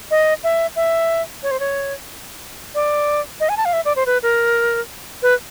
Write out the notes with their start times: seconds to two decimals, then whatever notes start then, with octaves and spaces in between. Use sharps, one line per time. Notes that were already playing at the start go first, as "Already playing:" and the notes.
0.11 D#5
0.44 E5
0.76 E5
1.43 C#5
1.51 C5
1.60 C#5
2.75 D5
3.40 D#5
3.49 G#5
3.57 A5
3.65 F5
3.73 E5
3.85 D5
3.96 C5
4.06 B4
4.23 A#4
5.22 B4